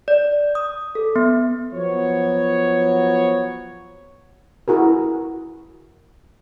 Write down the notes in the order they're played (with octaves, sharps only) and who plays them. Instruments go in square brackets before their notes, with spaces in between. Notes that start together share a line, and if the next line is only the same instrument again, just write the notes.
[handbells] D5
D#6
A4
B3
[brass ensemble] F3 F#3 B3 F#4 C#5
[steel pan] E4 F#4 G#4 A#4